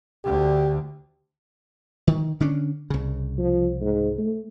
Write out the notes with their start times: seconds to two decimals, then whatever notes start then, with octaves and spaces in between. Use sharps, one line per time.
0.25 D2 D3 G4
2.07 D#3
2.40 D3 C#4 D4
2.90 C2 C#3
3.38 F3
3.81 G#2
4.18 A3